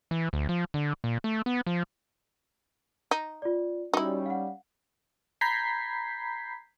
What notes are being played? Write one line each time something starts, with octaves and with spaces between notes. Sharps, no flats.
E3
D2
F3
D3
A#2
A3
B3
F3
D#4
F4 D5
G3 C#4 D#4 E4 F#4
F5 F#5
A#5 B5 G6 G#6 B6 C7